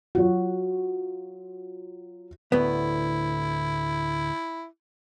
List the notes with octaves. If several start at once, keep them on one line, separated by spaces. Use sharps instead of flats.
F#3 F4 F#4
D2 A2 B3 E4